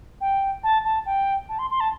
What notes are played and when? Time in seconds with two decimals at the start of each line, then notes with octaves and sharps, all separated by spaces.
0.21 G5
0.63 A5
0.84 A5
1.06 G5
1.49 A5
1.59 C6
1.71 C6
1.80 A5